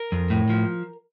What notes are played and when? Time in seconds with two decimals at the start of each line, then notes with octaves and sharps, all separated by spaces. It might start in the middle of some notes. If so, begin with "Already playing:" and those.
Already playing: A#4
0.12 F2
0.30 A2
0.49 F3